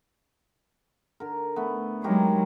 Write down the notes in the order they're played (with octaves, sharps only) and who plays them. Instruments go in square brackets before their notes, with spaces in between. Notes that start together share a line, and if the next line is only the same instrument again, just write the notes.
[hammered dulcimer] D3 A#4
A3 B3
[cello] F#3 G#3 [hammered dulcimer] D#4 G4 A#4